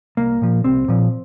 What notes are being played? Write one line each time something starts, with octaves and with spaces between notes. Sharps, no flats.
C2 A#3
A#2 F3
C2 C4
A#2 F3